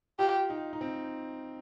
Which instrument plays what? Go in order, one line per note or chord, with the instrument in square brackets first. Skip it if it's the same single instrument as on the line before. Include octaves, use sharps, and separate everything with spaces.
[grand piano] F4 [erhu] G4
[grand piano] D#4
D#4
C4